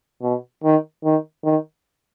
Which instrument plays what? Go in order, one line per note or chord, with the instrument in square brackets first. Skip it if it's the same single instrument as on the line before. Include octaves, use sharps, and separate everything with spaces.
[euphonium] B2
D#3
D#3
D#3